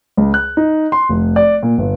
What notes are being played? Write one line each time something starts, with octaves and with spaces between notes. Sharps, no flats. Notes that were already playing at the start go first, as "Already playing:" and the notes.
C#2
F#6
D#4
C6
F1
D5
A#2
G1